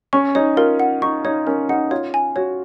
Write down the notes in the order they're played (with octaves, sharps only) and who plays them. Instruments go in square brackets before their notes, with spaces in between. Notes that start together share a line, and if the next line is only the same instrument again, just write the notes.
[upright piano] C#4 [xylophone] C#6
[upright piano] D#4 [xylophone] C#5
[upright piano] F4 [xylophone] A#4
[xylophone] F#5
[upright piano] D#4 [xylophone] C#6
[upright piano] D#4 [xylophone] C#5
[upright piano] C#4 [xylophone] A#4
[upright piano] D#4 [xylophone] F#5
[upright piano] F4 [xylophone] C#5
[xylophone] G#5
[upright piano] F#4 [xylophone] C#5